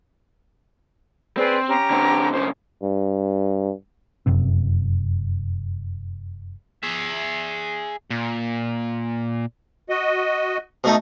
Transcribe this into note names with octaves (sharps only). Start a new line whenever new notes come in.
C4 G#4 B4 D5
C#4 G4 A#5
D3 C4
B1 C#3 C5
G2
F1 F#2 C3 C4
G#4 E5
A#2
F#4 D#5
B2 A3 D#4